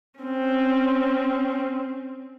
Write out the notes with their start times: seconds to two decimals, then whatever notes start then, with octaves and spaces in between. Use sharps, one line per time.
0.20 C4 C#4